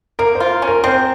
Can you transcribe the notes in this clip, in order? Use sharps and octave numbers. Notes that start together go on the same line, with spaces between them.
A#3 A#4
C5
F4
C#4
A#4
C4 C5